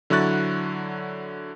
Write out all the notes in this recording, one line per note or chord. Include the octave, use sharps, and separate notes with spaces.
D3 F#3 E4 C#6 F#6 A6